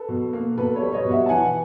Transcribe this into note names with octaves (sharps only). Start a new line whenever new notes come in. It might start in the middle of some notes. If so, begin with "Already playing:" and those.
Already playing: A4 B4
B2
A#3
B2 A4 B4
B4 C#5
G3
C#5 D#5
B2
E5 F#5
A5
E3 F#5 G#5